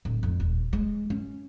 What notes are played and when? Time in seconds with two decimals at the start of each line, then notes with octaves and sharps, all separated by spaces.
0.05 D1
0.23 F2
0.40 D#1
0.73 G#3
1.10 C#4